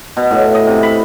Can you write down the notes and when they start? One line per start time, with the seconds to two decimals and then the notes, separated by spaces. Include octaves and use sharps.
0.17 B2
0.31 A2
0.55 D#5
0.67 C3
0.83 B5